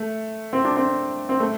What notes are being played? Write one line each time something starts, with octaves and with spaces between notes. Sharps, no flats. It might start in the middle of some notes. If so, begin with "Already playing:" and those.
Already playing: A3
C4
D4
C4
C4
A3